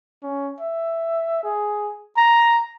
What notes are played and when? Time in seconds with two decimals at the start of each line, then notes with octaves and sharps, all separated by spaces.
0.23 C#4
0.60 E5
1.44 G#4
2.17 A#5